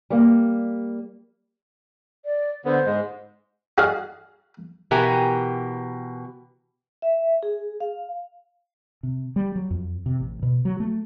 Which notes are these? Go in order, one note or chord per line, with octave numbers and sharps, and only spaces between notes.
G3 A#3
D5
D3 B3 C5
G#2 G#3
F#4 G#4 D5 D#5 F5
B2 E3 G4 A#4 G#5
E5
G#4
F5
C3
G3
F#3
F2
C3
A1
B2
F#3
A3